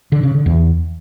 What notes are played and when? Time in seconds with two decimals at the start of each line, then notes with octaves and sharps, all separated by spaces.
0.12 D3
0.23 C#3
0.35 D3
0.46 E2